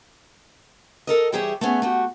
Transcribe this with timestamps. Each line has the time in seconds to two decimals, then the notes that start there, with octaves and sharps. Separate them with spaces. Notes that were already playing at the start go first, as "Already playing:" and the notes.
1.07 A4 A#4 D#5
1.32 E3 G3 G4 G#4 C#5 E5
1.61 A3 B3 C#4 G#4
1.82 A3 F#4 G4